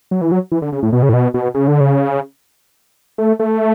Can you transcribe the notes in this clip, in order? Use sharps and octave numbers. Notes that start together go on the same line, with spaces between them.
F#3
E3
F#3
E3
D3
C#3
A2
B2
C#3
A2
B2
B2
C#3
D3
C#3
A3
A3